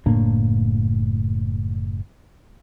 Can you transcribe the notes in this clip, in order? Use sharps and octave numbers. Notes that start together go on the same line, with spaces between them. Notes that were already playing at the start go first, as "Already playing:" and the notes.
F#1 A2 A#3 D4